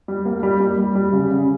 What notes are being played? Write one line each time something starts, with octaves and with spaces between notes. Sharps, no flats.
G3
A#3
G3
G3
G3
G3
C#3
C#3